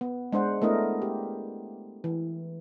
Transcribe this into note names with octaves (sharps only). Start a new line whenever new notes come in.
B3
G#3 D4 C5 F#5
A3 B3 D4 E4 A#4 D#5
G4
E3